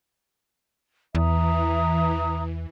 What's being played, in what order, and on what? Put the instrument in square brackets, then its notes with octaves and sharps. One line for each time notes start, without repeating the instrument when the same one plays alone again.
[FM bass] E2 [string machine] E3 [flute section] E5 A#5 D#6